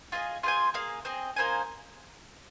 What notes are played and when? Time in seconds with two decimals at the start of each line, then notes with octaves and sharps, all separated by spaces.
0.12 F4 G#4 D#5
0.43 F4 G#4 C5 G#5
0.74 A#3 G#4 F5
1.05 C4 G#4 D#5
1.36 A#3 D#4 C5 G#5